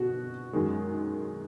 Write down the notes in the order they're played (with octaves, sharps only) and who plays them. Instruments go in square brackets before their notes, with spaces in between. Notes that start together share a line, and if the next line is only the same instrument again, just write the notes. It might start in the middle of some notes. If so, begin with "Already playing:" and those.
Already playing: [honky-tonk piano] B2 [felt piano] F#4
[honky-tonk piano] F#2 D#3 G#3